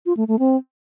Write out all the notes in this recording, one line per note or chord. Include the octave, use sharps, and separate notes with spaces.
F4
A3
A3
C4